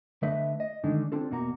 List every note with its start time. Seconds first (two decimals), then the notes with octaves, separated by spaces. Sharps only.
0.23 D3 A3 B4 D#5 E5
0.60 D#5
0.84 D3 D#3 G#3 A3 D4 D#4
1.12 C4 D4 F4 A4
1.30 E2 B2 A#3 F#4 A#5